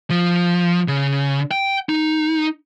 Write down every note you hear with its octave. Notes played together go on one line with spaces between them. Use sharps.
F3
C#3
G5
D#4